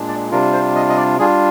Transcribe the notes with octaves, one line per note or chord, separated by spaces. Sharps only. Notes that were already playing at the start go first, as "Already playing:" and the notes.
Already playing: A#2 G#3 D4
D5
C3 G3 D4 F4 A#4
C5
D#5
D#5
D5
G3 D4 F4 G#4